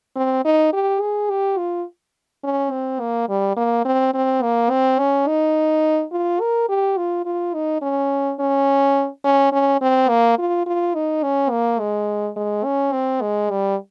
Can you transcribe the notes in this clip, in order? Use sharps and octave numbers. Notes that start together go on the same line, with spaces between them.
C4
D#4
G4
G#4
G4
F4
C#4
C4
A#3
G3
A#3
C4
C4
A#3
C4
C#4
D#4
F4
A#4
G4
F4
F4
D#4
C#4
C#4
C#4
C#4
C4
A#3
F4
F4
D#4
C#4
A#3
G#3
G#3
C#4
C4
G#3
G3